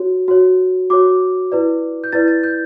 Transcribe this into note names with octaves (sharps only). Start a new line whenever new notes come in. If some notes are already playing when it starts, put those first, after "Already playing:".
Already playing: F#4 C#5
F#4 C#5
F#4 C#5 D6
E4 B4 D5
G6
E4 B4 D5 A6
A6
G6